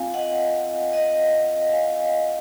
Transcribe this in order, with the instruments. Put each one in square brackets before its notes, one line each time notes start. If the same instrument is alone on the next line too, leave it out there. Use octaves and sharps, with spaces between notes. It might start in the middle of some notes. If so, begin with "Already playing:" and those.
Already playing: [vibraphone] C4 F4 F5 G#5
D#5 F#5
D#5 F#5
F5 G#5